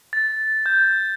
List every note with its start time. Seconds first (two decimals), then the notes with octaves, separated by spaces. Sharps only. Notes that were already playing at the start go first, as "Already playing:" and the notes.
0.13 A6
0.66 G6